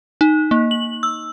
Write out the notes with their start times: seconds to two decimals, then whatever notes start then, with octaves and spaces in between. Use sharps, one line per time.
0.21 D#4
0.51 A#3
0.71 F#7
1.03 E6